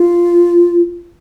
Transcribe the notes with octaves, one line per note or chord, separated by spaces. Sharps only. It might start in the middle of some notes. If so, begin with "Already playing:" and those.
Already playing: F4